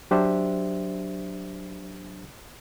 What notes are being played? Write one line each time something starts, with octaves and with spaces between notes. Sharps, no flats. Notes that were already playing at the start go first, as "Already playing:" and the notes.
F#3 D4 G4 C5 E5